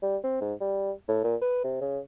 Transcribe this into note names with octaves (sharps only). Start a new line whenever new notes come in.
G3
C4
G#2
G3
A2
A#2
B4
C3
C#3